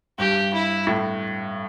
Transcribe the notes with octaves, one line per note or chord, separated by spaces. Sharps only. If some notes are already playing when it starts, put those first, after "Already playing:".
G2 G4
E4
A2